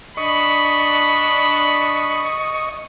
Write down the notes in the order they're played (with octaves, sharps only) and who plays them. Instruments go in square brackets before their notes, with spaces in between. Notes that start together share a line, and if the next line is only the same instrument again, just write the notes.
[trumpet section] D4 B5 [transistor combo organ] D#5 C#6